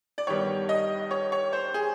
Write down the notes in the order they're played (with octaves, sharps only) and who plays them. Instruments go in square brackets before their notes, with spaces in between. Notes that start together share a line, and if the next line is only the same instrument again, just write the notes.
[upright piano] D5
G2 D#3 G3 B3 C#5
D#5
C#5
C#5
C5
G#4